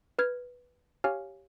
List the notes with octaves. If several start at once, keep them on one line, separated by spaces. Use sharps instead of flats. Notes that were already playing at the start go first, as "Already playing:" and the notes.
B4 F6 G#6
G4 C#5 F5 G#5 F6